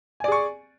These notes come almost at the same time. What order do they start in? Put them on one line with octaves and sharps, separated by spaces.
G#5 D5 G#4 C#6